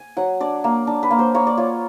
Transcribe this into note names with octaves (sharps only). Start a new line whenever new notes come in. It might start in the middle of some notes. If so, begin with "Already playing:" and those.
Already playing: G#5
F#3 F#5
D4 D5
A#3
D4
B4
A#3
C5
A#3 C#5
D5
F4 C#5